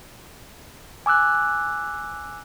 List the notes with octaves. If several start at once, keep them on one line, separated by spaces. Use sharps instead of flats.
G#5 D6 E6 F#6